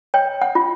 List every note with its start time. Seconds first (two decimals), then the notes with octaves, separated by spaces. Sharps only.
0.14 C#5 G5
0.41 F#5
0.55 F4